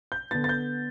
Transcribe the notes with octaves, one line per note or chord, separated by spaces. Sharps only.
G6
D3 B3 A6
A6
G6